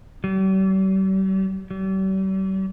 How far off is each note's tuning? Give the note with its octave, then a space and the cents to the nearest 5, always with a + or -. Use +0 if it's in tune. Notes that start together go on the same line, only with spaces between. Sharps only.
G3 -45
G3 -40